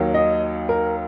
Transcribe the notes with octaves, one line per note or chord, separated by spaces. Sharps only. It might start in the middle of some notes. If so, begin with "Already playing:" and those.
Already playing: D#2 D#3 F#3
D#5
A#4